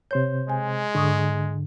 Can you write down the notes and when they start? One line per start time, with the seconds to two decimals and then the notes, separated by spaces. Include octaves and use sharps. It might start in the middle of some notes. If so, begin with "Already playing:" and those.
0.11 C3 C5 C#5 G6
0.50 G#3 G#5
0.95 G#2 D3 C#6 D#6